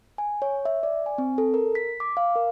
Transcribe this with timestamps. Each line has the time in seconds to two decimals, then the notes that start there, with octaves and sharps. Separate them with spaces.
0.18 G#5
0.42 C#5
0.65 E5
0.83 D5
1.06 G#5
1.18 C4
1.38 A4
1.54 A#4
1.75 B6
2.00 D6
2.17 F5
2.36 A#4